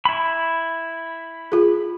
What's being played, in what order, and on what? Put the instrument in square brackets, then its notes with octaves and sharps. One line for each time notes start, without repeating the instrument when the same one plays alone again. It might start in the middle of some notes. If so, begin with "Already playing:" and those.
[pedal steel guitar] E4 B5
[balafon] F4 G#4